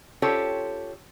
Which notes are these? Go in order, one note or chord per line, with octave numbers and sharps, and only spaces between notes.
C#4 F4 G4 A4 C5 C#5